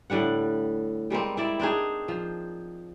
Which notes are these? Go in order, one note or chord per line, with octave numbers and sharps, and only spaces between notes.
A2 D3 G3 F#5
G3 G#3 A#3 C4
C4 E4 D5
C4 D4 D#4 G#4
F3